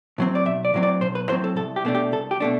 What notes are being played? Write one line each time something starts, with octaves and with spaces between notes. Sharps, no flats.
A2 F#3 C4
D5
B1 E5
D5
A2 F#3 C4
D5
B1 C5
B4
A2 F#3 C4 C5
A4
C2 A4
G4
B2 A3 D4
G4
C2 A4
G4
B2 A3 D4